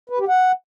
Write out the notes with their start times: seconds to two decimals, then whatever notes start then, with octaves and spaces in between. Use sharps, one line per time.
0.10 B4
0.19 G4
0.28 F#5